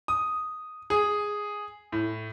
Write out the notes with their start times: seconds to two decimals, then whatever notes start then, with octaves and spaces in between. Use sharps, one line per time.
0.08 D#6
0.90 G#4
1.92 A2